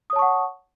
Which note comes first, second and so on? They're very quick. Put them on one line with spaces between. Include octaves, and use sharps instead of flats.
D#6 C#5 A5 C#6 F#5